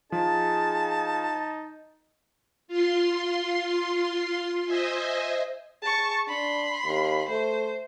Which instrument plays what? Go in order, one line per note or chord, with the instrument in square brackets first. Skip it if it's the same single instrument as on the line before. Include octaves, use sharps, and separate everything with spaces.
[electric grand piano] F3 [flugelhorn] D#4 [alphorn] G#4 [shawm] A5
[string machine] F4 C6
C5 D#5 E5 G#5
[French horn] G#4 [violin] A5 C#6
[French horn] D4 [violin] B5 C6
[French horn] D#2
[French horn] A3 [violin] C5